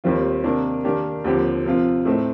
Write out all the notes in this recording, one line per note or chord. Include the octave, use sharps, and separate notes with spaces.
D#2 D#3 G3 C4 F4
C3 D#3 A#3 D4
D#3 A#3 D4 G4
D#2 D3 F3 C4 G4
C3 F3 C4 F4
A2 A3 C4 D#4